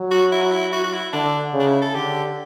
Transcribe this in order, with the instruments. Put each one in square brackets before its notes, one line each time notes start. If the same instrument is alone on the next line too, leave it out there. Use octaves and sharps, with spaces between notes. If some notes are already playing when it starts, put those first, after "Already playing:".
Already playing: [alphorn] F#3
[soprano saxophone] F#4
E4
F#4
E4
F#4
F#4
E4
[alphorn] D3 [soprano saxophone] D4
[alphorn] C#3
[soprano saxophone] D4
E4
A4
[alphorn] D3 [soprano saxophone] G4